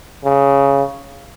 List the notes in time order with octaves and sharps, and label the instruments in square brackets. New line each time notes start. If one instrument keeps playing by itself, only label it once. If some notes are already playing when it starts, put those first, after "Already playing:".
[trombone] C#3